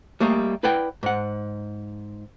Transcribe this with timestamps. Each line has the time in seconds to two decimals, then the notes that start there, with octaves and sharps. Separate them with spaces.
0.20 G3 A3 A#3 D#5
0.63 E4 B4 D5 F#5 G5
1.03 G#2 F#5